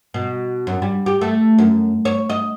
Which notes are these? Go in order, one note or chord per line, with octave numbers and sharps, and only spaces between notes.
B2
F#2
G3
G4
A3
F#2
C#5
D#5